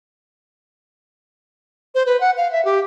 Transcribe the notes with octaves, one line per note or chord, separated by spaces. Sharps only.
C5
B4
F#5
F5
E5
G4